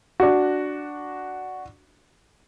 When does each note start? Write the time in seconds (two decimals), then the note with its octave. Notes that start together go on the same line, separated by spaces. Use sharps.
0.20 D4 F#4